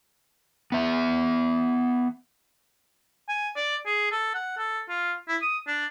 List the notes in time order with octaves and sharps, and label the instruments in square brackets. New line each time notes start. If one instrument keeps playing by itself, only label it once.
[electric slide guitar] B3 E5
[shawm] G#5
D5
G#4
A4
F#5
A4
F4
E4
D#6
D4